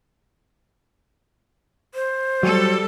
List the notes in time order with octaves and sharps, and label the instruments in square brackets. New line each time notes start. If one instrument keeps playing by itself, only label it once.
[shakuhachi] C5
[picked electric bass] F#3 [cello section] G3 A4